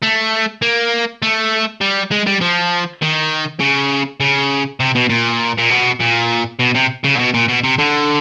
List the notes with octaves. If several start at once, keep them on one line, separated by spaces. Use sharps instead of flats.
A3
A#3
A3
G3
G#3
G3
F3
D#3
C#3
C#3
C3
B2
A#2
A#2
B2
A#2
B2
C3
C#3
A#2
B2
A#2
B2
C3
D3